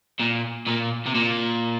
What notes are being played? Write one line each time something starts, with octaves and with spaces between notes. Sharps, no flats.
A#2
A#2
C3
A#2